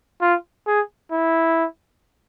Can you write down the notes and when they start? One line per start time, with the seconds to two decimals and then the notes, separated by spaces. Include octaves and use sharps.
0.21 F4
0.67 G#4
1.11 E4